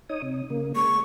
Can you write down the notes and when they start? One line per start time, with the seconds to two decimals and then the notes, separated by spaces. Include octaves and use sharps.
0.09 D#4 C#5 D#6
0.22 C3
0.50 C#3 A#3
0.76 G#3 C#6